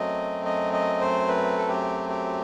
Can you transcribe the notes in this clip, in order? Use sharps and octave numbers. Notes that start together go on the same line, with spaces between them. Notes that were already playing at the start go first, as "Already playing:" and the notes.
Already playing: F#2 F#3 A3 C4 D#5
D#5
D#5
C5
B4
A4
G4
G4